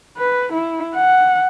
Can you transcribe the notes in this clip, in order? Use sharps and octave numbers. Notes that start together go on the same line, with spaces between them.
B4
E4
F#5